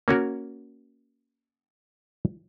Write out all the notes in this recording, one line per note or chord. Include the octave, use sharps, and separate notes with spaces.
A#3 C#4 F#4 A#4